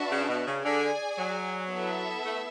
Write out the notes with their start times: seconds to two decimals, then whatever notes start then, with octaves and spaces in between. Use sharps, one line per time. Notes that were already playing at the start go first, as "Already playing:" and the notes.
Already playing: D4 F#4 B4 E5 A5
0.11 C#3
0.29 B2
0.47 C#3
0.65 D3 G#4 D5 G#5
1.18 F#3
1.71 B3 E4 A4 E5
2.24 A3